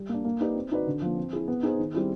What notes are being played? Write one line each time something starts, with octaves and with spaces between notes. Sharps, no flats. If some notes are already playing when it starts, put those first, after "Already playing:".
Already playing: G3
A#3 D4
A#3
D#4 G4 B4 D5
C4
D#4 F#4 B4 D5
D3
F3 A#3
C4
E4 G#4
B3
D#4 G#4 C5
D#3
G3 C4 E4 G#4